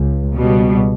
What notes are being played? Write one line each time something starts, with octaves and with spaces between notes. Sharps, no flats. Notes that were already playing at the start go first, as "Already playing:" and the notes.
Already playing: C#2
C#2 B2 G3